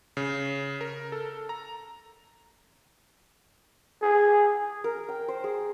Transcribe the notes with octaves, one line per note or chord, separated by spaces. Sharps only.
C#3
A#4
A4
A#5
G#4
A#4
G5
C5
G#4